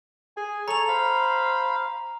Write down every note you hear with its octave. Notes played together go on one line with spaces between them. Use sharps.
G#4 G#5
A4 C#5 A#5 F7
C5 F5 B5